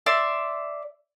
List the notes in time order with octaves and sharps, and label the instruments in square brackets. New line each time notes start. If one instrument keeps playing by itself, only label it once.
[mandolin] D5 E5 C6